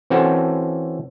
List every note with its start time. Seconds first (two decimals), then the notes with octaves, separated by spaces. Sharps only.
0.10 E3 C4 C#4 F#4 A4 A5